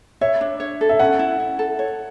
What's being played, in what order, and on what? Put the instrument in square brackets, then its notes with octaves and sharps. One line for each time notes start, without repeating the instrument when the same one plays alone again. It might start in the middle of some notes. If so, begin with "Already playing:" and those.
[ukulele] C#5 [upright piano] E5
[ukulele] D4
C#5
A4
[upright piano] E5
[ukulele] C#4 [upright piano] F#5
[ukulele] E4
E4
A4
C#5